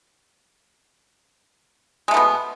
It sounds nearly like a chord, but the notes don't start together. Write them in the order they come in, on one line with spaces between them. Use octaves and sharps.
G#3 A3 B3 B2